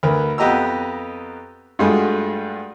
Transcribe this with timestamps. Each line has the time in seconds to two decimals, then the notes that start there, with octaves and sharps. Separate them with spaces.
0.03 D2 A#4 B4
0.38 F2 B3 G4 D#5 A#5 E6
1.79 G2 G#3 A3 F4 F#4